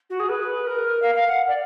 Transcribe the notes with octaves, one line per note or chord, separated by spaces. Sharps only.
F#4
G#4
B4
A#4
F5
F5
F#5
D5